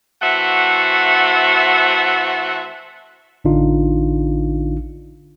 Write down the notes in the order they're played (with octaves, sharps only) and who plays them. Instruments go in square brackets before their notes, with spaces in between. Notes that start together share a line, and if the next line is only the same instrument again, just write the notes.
[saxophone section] E3 A3 C4 F#4 E5 F#5
[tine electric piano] A1 D3 D4 D#4 F4